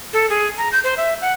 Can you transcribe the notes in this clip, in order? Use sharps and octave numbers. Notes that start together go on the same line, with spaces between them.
A4
G#4
A#5
G6
C5
E5
F#5